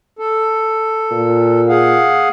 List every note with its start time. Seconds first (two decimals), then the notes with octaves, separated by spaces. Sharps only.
0.19 A4
1.11 A#2
1.69 G#4 F5 F#5